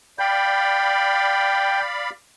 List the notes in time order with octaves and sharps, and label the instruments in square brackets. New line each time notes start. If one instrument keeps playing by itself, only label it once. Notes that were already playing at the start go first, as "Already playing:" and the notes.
[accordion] D5 F5 B5 [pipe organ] G5